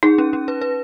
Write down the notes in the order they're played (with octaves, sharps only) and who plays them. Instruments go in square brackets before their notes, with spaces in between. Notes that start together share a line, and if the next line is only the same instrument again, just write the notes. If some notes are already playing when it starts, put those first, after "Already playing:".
[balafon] D#4 [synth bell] G#4
[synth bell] C#4
C#4
B4
B4